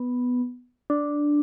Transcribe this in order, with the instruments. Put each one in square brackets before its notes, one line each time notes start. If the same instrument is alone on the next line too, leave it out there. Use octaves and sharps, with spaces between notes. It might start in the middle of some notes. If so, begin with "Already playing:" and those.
Already playing: [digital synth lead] B3
D4